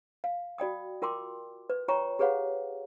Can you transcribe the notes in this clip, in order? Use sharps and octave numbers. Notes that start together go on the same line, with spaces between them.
F5
F#4 D5 G5 D#6
F4 A#4 G5 C6 D6
B4
F4 C#5 G5 A#5 C#6
G4 G#4 B4 C#5 F5 F#5